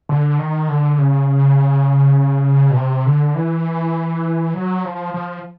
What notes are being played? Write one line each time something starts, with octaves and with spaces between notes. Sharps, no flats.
D3
D#3
D3
C#3
B2
C3
D3
E3
F#3
F3
F3